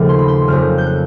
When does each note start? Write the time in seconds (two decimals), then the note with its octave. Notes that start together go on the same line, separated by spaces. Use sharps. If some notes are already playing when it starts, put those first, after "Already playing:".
Already playing: D#2 C#3 F3 A3
0.09 C6
0.19 B5
0.28 C6
0.48 F#1 F2 C#3 F6
0.78 G6
0.86 F#6